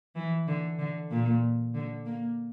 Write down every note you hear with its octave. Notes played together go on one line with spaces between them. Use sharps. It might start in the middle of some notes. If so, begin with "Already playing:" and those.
E3
D3
D3
A#2
D3
A#3